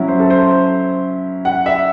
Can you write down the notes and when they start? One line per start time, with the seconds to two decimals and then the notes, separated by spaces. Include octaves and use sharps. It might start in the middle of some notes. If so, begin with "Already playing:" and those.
Already playing: F#3 C#4 E4
0.08 C5
0.19 A4
0.30 C5
1.45 F#5
1.66 E5